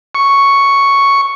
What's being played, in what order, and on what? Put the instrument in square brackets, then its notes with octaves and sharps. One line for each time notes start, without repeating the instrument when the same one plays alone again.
[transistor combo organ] C#6